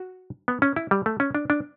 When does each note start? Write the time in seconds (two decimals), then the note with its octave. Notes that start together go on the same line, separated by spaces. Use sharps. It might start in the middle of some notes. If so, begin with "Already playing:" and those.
Already playing: F#4
0.48 B3
0.62 C#4
0.76 E4
0.91 G3
1.06 A3
1.20 C#4
1.35 D4
1.50 D4